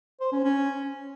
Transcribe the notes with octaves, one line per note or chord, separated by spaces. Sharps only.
C5
C#4
C#4